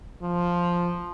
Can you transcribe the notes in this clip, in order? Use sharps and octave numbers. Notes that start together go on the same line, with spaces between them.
F3